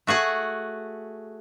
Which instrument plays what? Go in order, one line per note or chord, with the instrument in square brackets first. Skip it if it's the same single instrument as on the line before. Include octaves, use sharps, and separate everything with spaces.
[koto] A3 F#4 G#4 F#5